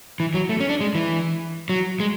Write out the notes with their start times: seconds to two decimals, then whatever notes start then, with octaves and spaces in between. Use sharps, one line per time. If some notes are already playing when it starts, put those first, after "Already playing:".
0.20 E3
0.34 F#3
0.49 A3
0.60 C#4
0.69 D4
0.80 G#3
0.95 E3
1.69 F#3
2.00 G#3